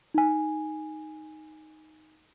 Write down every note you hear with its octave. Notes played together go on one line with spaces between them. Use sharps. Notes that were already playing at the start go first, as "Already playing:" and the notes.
D#4 G#5